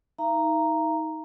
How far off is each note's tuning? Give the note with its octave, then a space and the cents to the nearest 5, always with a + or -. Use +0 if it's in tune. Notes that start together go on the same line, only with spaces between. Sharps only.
D#4 +25 F5 -45 A#5 +0